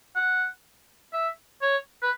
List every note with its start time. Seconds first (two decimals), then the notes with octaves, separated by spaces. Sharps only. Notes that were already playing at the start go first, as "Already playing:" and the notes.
0.16 F#5
1.13 E5
1.62 C#5
2.02 B4